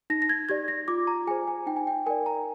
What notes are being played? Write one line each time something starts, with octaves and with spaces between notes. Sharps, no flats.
D#4 A#6
A#6
G#6
G4 D5 G#6
A#6
F4 D6
A#5
G#4 C5 G#5
G#5
D#4 G5
G#5
G5
A#4 D5 G#5
A#5